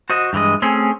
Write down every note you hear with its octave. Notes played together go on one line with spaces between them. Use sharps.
F#4 C5 D#5
G2 E3 G#3 D#5
A3 C4 C#4 G#4